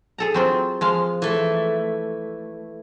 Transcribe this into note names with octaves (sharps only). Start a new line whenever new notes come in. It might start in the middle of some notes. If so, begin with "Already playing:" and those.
G#4 A4 A#5
F#3 C4 F4
F3 G#3 F5
E3 A3